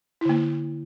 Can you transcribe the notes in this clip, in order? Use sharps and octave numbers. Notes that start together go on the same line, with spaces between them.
D3 A#3 E4